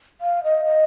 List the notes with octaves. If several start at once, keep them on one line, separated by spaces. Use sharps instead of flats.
F5
D#5
D#5